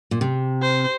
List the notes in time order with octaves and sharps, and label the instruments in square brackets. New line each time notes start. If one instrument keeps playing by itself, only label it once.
[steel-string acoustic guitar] A#2
C3
[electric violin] C5